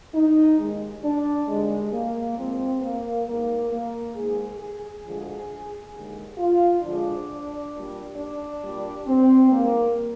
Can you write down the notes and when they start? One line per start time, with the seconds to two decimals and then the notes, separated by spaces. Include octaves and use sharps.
0.14 D#4
0.59 D#2 D#3 G#3
1.04 D4
1.48 D#2 D3 G3 G#3
1.93 A#3
2.37 A#2 F3 G#3 C4
2.81 A#3
3.26 G#2 G3 A#3
3.70 A#3
4.16 G#2 D#3 G#3 G#4
4.60 G#4
5.05 D2 D3 F3 G#3
5.94 D#2 D3 G#3
6.38 F4
6.83 D2 D3 F3 G#3 D4
7.73 A#2 G3
8.17 D4
8.61 A#2 G3
9.07 C4
9.51 G#2 G3 A#3